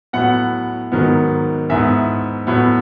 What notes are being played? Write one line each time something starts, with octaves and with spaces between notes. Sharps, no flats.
A2 F#3 B3 F#5
G#2 D#3 F#3 B3
G#2 E3 B3 E5
A2 F#3 B3